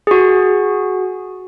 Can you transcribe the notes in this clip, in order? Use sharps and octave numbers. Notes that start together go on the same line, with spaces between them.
F#4 G#4